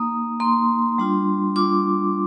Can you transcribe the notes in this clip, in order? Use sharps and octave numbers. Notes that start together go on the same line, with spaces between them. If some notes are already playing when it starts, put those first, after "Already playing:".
Already playing: A#3 D#4 D#6
A#3 D#4 C6
G3 D4 F4
G3 D4 F4 D6